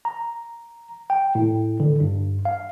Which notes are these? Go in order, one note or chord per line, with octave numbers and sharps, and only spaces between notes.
A#5
G5
A2
D3
G2
F5